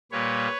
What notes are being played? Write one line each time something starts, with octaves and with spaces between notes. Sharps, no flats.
A#2 G3 A#3 B4 C#5